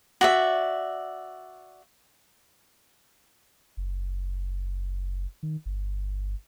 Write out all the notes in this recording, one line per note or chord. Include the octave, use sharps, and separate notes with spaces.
F#4 D5 E5
F#1
D#3
G1